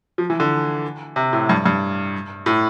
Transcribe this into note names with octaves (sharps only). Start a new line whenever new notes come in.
F3
E3
D3
C3
A2
G2
G2
A2